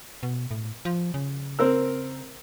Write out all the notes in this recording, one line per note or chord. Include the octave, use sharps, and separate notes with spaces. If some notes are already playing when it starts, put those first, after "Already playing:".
B2
A2
F3
C#3
C4 A#4 E6